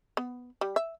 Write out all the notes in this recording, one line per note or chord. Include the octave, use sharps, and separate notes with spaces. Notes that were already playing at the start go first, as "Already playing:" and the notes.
B3
G3
E5